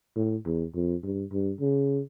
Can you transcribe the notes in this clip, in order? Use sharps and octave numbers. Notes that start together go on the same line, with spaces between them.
A2
E2
F2
G2
G2
C#3